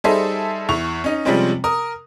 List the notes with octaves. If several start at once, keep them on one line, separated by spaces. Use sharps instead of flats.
G3 D#4 G#4 A4 C5 E5
E2 E4 C#6 F7
C#4 D#4
C3 F3 G3 G#3 C4 C#4
A#4 D#6